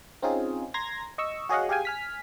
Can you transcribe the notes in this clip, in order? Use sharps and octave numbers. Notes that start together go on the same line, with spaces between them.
C4 C#4 D#4 F4 G#4
A#5 C6 G#6 A#6
D#5 C#6 E6
F#4 G#4 C#5 D#5 F5 F#5
G4 G#4 F5 G5 G#5
G#5 F6 B6